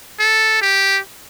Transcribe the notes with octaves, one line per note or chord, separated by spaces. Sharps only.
A4
G4